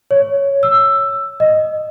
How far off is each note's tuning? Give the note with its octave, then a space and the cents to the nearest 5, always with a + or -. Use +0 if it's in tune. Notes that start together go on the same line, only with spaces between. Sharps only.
C#5 +5
E6 +10
D#5 +0